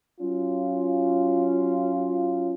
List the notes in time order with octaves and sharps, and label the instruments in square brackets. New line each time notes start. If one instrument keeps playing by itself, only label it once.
[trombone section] F#3 C#4 F4